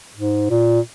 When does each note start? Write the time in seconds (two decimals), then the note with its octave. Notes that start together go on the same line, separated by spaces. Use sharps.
0.15 G#2
0.50 A#2